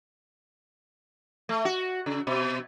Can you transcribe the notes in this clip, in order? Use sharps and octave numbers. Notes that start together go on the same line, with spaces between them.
A3
F#4
C#3
B2